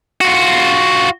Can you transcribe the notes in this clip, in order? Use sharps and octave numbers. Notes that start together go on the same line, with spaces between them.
F4 F#4